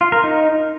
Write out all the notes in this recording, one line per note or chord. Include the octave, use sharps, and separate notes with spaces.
F4
A#4
D#4